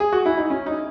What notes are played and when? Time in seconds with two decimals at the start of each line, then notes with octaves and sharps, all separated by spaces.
0.00 G#4
0.13 F#4
0.26 E4
0.37 D#4
0.50 C#4
0.66 D#4